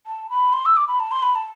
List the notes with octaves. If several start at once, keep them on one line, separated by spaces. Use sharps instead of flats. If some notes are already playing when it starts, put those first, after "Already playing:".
A5
B5
C6
E6
D6
B5
A5
C6
B5
A5